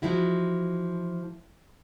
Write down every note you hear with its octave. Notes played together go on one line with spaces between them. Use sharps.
E3 F3 G#3 E4 F#4